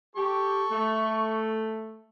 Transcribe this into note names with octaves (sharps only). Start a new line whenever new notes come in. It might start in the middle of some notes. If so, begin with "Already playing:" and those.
G4 A4 C#6
A3